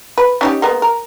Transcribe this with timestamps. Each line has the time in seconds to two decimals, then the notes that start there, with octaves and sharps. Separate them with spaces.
0.18 B4
0.41 C#4 D#4 G4
0.62 G#3 A#3 B3
0.82 A#4